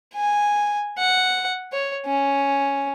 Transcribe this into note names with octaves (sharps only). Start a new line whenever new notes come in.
G#5
F#5
C#5
C#4